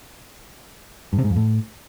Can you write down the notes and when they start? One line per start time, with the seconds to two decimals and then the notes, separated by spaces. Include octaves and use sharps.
1.13 G2
1.19 C3
1.24 G#2
1.30 F2
1.36 A2